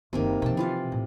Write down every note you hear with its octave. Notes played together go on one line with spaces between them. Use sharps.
F#1 C3 D#3 A#3
C3 F3 G5 A5
E3 F4 F5
A2